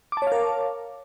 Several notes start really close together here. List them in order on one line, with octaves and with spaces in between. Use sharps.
D6 A5 C#5 F5 A#4